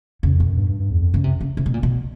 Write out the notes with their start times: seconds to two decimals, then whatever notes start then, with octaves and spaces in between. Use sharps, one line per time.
0.23 E2 C#3
0.34 F2
0.40 B2
0.46 F#2
0.57 G2
0.69 G2
0.80 G2
0.91 E2
1.01 F2
1.13 F#2 C#3
1.24 C3
1.41 C#3
1.57 C3
1.66 B2
1.74 A#2
1.83 B2